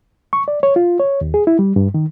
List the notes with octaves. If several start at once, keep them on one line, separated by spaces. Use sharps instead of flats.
C#6
D5
C#5
F4
C#5
D#2
G#4
E4
G3
G2
D#3